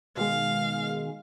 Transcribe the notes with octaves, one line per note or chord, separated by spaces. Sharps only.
B2 D#3 G#3 F5